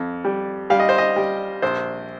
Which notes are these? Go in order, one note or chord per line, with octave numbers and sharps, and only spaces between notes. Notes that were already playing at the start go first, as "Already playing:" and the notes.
Already playing: F2
G3
G3 F5
D#5
C5
D#5
G3
A#1 C5